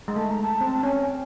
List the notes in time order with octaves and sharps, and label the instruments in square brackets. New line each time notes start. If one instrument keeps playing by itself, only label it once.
[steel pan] G#3
[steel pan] A3 [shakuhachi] A5
[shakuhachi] A#5
A5
[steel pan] C4
[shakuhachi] A5
[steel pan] C#4 [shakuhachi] G#5
[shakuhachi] G5